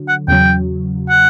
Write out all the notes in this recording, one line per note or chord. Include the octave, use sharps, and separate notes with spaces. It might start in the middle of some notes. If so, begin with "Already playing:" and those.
Already playing: D3 F#3
F#5
E2 C#3 F#3 G5
F#5